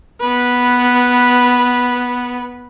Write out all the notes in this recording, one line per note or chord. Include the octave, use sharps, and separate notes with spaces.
B3 B4